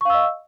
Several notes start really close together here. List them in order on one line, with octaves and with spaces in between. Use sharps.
C#6 F5 E6 D#5